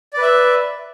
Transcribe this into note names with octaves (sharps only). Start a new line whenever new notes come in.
B4 D5 E5